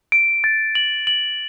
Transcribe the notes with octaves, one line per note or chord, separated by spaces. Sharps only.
D7
A6
F#7
F#7